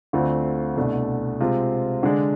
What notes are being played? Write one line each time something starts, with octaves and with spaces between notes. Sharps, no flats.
D2 D3 A3 C4 F4
C2 B2 A3 D4
C3 G#3 C4 F4
D3 G#3 D4